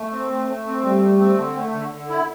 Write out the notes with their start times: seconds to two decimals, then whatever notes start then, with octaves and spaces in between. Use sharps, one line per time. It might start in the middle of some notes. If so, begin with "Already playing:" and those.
Already playing: A3
0.12 C4
0.29 A3
0.47 A3
0.65 C4
0.83 G3 A3
1.01 A3
1.19 C4
1.36 D3
1.55 A3
1.72 D3
1.91 D3
2.08 E4